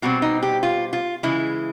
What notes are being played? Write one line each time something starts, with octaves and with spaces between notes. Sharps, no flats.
B2 G3 C4 F#4
D#4
G4
F4
F4
C#3 E3 G#3 E4